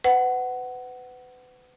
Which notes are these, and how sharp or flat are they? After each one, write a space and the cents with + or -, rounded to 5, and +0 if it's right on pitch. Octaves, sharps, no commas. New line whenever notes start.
B4 +35 F#5 +15